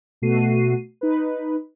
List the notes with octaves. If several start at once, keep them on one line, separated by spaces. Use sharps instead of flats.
B2 A3 F#4 C7 D#7
D#4 B4